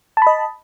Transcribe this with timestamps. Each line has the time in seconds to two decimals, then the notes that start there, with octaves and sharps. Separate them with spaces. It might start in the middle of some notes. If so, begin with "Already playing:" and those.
0.17 A5
0.22 B5
0.27 D#5